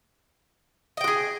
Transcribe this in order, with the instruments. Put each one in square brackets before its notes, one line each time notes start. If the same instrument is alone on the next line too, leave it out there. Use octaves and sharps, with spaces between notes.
[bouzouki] D#5
G5
F#4
G#4